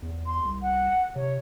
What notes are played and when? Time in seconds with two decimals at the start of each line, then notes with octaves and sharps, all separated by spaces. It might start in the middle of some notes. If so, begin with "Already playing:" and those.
0.02 E2
0.26 C6
0.45 C2
0.62 F#5
1.16 C3 C#5